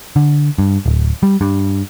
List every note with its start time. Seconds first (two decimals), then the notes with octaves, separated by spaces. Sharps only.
0.16 D3
0.58 G2
0.86 D1
1.23 G3
1.41 G2